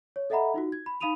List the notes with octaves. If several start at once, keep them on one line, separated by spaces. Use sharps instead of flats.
C#5
A4 D#5 E5 F#5 A#5 B5
D#4 F4 F#4
G#6
B5
D#4 F5 B5 D#6 D#7 F7